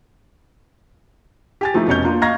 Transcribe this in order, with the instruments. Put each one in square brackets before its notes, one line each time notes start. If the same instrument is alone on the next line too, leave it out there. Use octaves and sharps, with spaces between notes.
[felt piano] G4 G#5 A6
F3 A3 D#4 E4
F1 B2 C#4 C#5 D#5 G6
A#3 D4 F4
D#5 F5 A#5 C#6 G#6 A#6